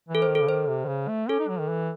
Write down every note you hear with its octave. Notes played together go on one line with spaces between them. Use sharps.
E3
A4
C5
D#3
A4
C#3
D#3 C5
C3
D#3
C#3
A3
C#4 A4
D#4
F#3
D#3
E3